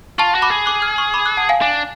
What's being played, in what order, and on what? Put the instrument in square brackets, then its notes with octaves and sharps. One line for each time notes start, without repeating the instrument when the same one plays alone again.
[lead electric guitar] F4 [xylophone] A5 C#6
[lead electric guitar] F#4
[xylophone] B5 D6
[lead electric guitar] G#4
[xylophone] D6 F#6
F6 G#6
C#6 F6
B5 D6
D6 F#6
F#5 A5
F5 G#5
[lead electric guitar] D4 [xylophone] F5 G#5